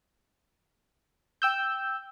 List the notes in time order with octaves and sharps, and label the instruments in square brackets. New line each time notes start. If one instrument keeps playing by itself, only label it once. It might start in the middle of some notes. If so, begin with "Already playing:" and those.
[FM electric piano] G5 E6 G6